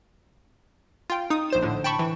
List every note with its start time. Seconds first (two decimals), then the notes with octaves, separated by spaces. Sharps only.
1.10 F4 G5
1.30 D#4 D#6
1.50 A#1 C5 E7
1.62 A2 D3 D4
1.84 G5 A5 B5 C#6
1.99 E3